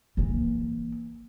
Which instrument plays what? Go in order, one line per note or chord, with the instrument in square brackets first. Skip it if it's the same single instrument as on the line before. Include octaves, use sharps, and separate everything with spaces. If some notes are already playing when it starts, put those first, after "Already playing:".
[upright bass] E3 A#3